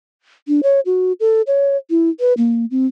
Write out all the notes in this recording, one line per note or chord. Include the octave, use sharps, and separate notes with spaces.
D4
C#5
F#4
A4
C#5
E4
B4
A#3
C4